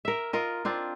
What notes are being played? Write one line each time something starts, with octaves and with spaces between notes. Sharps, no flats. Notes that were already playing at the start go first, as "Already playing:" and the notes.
A#4 E5
F4 A#4 D#5
C4 D4 F4